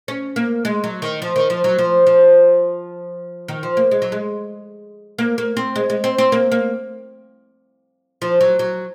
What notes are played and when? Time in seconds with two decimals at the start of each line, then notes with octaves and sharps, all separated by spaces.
0.08 C#4
0.36 A#3
0.65 G#3
0.84 F#3
1.02 D#3
1.22 F3
1.36 D#3
1.50 F3
1.64 F#3
1.79 F3
2.07 F3
3.48 D#3
3.63 F3
3.77 A#3
3.91 G#3
4.02 F#3
4.12 G#3
5.18 A#3
5.38 A#3
5.57 C4
5.76 G#3
5.90 G#3
6.04 C4
6.18 C4
6.32 A#3
6.52 A#3
8.22 F3
8.41 F#3
8.59 F#3